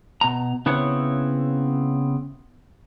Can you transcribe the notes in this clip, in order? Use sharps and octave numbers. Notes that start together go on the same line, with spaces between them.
B2 A#5
C#3 B3 C4 E4 C#5